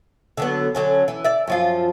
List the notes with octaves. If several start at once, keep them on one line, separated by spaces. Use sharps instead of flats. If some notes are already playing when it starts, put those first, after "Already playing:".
D3 F#3 B3
D3 F#3 C#4
E3
D5 E5
F#2 F3 F4